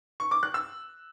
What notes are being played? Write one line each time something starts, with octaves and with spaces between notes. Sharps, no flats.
C#6
D6
F#6
E6